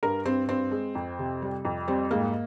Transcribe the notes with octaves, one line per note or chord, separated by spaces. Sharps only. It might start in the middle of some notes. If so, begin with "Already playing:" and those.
G2 A#4
G2 C4
G2 C4
G#3
F2
C3
G3
F2
G3 C4
G#2 A#3